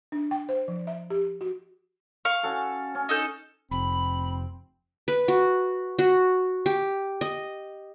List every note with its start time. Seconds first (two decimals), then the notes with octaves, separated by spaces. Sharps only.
0.12 D4
0.31 G5
0.49 C5
0.68 F3
0.87 E5
1.10 G4
1.41 F#4
2.25 F5 C#6
2.43 C#4 F#4 A4
2.95 C#4
3.09 D#4 A4 G6
3.71 F1 C4 B5
5.08 B4
5.28 F#4
5.99 F#4
6.66 G4
7.21 D#5